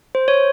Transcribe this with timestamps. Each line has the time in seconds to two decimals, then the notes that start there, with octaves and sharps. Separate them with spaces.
0.15 C5
0.28 C#5